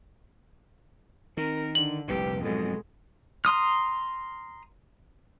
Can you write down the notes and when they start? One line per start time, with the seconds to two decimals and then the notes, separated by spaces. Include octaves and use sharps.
1.37 D#3 C4 A#4
1.75 D3 D4 F#7
2.08 F1 C2 A#2 G4 B4
2.43 F2 G#2 B2 F#3 G#3 A4
3.45 A#5 C6 D#6 F6